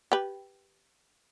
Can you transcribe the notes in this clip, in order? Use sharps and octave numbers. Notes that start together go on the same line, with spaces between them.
G4 B4